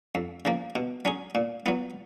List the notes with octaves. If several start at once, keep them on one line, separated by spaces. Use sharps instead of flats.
F2
C#3 F3 A#3
B2
F#3 C#4 G#4
A#2
F#3 B3 F4